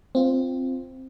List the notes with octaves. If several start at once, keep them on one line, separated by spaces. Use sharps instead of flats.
C4 F4